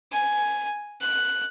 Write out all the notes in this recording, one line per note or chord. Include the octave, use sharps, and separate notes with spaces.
G#5
F#6